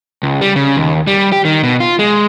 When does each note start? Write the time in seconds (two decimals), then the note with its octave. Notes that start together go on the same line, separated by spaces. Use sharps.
0.23 C#2
0.41 G3
0.56 C#3
0.77 D#2
1.07 G3
1.33 G4
1.45 D#3
1.63 B2
1.80 F4
1.99 G#3